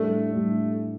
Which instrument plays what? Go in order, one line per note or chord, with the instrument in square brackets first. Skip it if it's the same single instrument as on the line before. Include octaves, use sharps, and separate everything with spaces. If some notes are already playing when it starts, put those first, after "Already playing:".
Already playing: [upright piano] A2 G3 D4 [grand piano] A3
[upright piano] A2 G3 D4